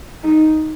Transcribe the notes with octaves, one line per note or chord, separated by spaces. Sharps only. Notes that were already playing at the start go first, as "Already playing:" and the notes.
D#4